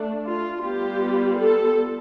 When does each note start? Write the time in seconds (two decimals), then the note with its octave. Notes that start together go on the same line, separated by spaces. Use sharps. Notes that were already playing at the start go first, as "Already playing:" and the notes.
Already playing: A3 D4
0.27 F4
0.63 G3 B3 F4 G4
1.37 A4